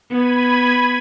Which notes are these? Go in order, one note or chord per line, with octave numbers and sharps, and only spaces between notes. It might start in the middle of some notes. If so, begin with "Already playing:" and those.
B3 B5 G#6 D#7